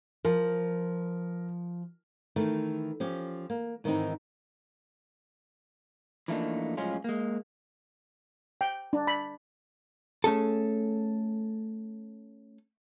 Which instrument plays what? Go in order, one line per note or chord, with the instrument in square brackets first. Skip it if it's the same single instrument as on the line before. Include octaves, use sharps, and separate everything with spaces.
[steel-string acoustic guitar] F3 [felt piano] A#4
[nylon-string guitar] D#3 E3 A3
F3 C#4 G4
A#3
G#2 D#3 E3 G#3 C4 D#4
[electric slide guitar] E3 F3 A3 A#3 D4 D#4
F#2 A2 F3 G#3 C#4 F4
G#3 A#3
[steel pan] G5
D4
B5
[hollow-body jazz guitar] A3 C#4 G#4 A4